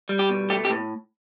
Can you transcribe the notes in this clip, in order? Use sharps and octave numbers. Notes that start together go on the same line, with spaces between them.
G3
G4
B2
A3 G4
G4
A2